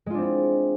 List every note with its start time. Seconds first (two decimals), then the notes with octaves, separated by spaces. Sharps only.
0.06 G#3
0.10 F4
0.14 D4
0.18 C4
0.22 E4